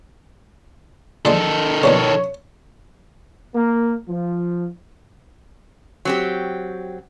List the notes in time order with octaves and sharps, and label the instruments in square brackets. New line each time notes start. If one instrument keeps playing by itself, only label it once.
[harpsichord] D3 F3 G#3 [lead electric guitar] D#3 A4
[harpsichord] F2 B2 D3 [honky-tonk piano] C#5
[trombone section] A#3
F3
[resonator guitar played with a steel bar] F#3 C4 G4